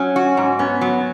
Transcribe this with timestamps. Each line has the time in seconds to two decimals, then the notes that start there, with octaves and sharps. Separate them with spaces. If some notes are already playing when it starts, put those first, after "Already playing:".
Already playing: F#3 C#4
0.16 F#4
0.37 G#2
0.59 B3 C#4
0.81 F#3